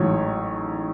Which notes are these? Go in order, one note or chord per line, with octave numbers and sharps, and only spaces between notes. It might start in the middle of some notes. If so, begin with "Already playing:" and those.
Already playing: A1 G#2 F#3 C#5